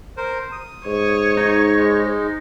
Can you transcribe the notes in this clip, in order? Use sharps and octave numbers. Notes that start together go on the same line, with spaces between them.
A#4 C5
D#6
G#2 C#5
D#4
G#3